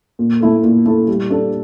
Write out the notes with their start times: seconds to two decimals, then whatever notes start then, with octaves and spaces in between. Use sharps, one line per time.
0.19 A#2
0.41 A3 E4 A4
0.63 A#2
0.86 A3 E4 A4
1.08 G3
1.30 D4 A4